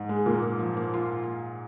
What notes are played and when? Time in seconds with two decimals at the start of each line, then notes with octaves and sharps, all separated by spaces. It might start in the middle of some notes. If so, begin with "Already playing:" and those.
Already playing: G#2
0.09 G#3
0.26 A#2 A#3
0.42 A#3
0.59 F3
0.77 A#3
0.94 F4